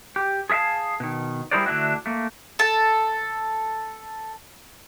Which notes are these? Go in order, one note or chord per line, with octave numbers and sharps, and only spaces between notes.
G4
G#4 A4 E5 F5 A5
B2 D#3
G3 E4 G#4 A#4 C5 D5
D3 A3 D4 E4 F#4
A3 A#3
A4 A5